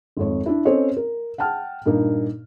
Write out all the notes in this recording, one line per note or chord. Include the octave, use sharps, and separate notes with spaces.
G#1 F2 C#5
D4 E4
C4 C#4 A4 C5 C#5 D#5
A#4
F#5 G5 A5 F6
G2 A#2 A#3 D#4